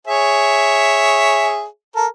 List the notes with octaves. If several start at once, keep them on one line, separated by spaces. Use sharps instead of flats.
G#4 C#5 E5
A4 A#4